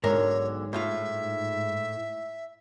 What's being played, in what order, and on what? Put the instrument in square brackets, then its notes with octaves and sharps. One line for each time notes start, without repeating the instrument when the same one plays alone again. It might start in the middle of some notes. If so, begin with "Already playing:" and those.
[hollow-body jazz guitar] B1 D3 A#4 [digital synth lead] G#2 [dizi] C#5
[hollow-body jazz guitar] A2 F4 F5 [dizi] E5